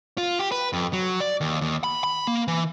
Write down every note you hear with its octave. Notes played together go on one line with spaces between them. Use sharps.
F4
G4
B4
F2
F#3
D5
D#2
D#2
B5
B5
A#3
E3